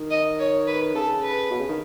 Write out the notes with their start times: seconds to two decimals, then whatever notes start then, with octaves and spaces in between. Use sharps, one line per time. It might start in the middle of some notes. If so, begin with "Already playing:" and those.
Already playing: D#3
0.11 D#5
0.39 C#5
0.67 B4
0.95 C#3 A4
1.23 B4
1.51 B2
1.60 C#3
1.69 D#3